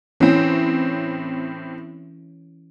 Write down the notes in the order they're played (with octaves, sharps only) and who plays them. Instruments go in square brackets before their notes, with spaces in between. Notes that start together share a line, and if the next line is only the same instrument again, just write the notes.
[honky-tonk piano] A2 C4 [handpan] E3 C#4